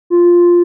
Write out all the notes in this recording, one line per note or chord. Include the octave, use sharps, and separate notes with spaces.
F4